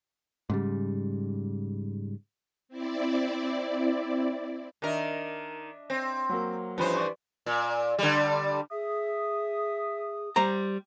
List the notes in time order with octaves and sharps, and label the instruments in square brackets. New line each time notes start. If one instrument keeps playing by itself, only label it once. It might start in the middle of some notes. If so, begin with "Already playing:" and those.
[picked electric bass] G#2 C#3 G3
[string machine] C4 E4 D5
[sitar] D#3 A#4 [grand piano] D4 D#5 E5
[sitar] C4
[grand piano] F#3 A#3
[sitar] G2 E3 C5 [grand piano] F3 C#4 B5
[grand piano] D5 C#6
[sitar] A#2
D3 G3
[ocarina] G#4 [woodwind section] E5 D#6
[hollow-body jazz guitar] G3 C5 A#5